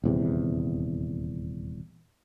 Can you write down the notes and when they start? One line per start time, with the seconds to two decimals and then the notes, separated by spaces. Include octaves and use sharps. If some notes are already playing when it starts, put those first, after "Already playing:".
0.04 D#1 E2 C3